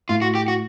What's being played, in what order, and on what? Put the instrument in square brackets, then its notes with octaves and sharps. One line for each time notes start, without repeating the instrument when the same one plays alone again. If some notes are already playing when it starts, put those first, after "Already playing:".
[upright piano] A2 [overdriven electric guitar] F4
[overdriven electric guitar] F#4
G4
F#4